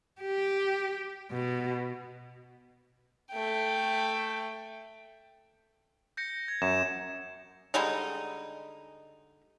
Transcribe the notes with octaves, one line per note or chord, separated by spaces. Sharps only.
G4
B2
A3 G5
G6 A#6 C#7
G#6
F#2 E7
D3 G3 G#3 D#4